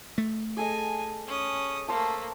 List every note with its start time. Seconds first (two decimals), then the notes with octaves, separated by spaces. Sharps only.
0.18 A3
0.57 G#4 A4 D#5 G#5
1.27 C#4 D#6
1.88 A3 A#3 C5 A5